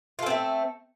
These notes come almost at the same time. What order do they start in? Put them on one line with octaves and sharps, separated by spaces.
F4 A4 C4 A3